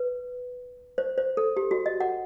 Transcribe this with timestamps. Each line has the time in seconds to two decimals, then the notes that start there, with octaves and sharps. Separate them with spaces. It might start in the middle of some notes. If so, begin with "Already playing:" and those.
Already playing: B4
0.98 C5
1.18 C5
1.37 A4
1.57 G4
1.71 F#4
1.86 D#5
2.00 F#5